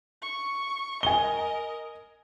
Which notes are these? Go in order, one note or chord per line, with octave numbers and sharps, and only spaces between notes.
C#6
A#4 D#5 G#5 G7